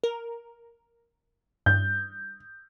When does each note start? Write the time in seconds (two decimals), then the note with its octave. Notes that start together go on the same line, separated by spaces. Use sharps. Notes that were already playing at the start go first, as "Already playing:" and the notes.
0.04 A#4
1.66 G2 G6